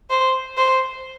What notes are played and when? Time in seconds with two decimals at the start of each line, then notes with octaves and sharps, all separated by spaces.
0.10 C5
0.57 C5